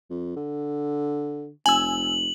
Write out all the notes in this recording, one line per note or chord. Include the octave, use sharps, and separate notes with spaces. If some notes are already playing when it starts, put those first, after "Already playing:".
F2
D3
F1 G#5 E6 F#7